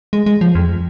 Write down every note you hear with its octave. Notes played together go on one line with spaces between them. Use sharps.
G#3
G#3
F3
F2